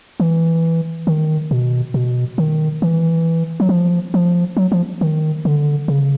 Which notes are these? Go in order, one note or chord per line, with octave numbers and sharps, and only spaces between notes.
E3
D#3
B2
B2
D#3
E3
F#3
F3
F3
F#3
F3
D#3
D3
C#3